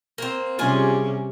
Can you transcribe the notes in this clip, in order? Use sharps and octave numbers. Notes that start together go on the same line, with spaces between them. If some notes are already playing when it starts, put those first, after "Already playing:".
A#3 C4
C3 G3 C#4 F4 G#4 G#5